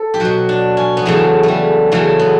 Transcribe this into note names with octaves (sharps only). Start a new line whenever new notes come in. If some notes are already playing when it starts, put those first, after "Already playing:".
Already playing: A4
G4
B2 F#3 F#4
D4
C#4
B3
E2 C#3 F#3 A3
G3 A3
E2 C#3 F#3 A3
B3